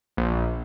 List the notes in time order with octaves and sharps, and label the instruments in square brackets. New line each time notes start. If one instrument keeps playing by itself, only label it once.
[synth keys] A#1